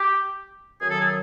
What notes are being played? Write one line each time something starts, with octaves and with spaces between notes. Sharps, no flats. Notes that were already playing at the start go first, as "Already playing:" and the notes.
Already playing: G4
F#2 D#3 F#3 G#4
A4
G#4